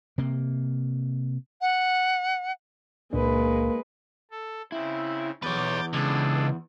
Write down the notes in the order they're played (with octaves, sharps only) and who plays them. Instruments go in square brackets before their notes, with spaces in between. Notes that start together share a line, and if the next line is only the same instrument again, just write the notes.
[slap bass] C3 A#3
[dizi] F#5
[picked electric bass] C#2 A#2 D4 [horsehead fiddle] G#3 B4 [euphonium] A#3
[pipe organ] A4
[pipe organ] C#3 C4 [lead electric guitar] E4
[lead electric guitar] E2 [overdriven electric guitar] B4 C#5 [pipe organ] D6 G6 A6
[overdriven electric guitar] C#2 [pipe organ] D4 G#4 A4